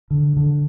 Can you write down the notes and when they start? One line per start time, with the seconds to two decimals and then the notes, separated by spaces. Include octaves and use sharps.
0.10 D3
0.37 D3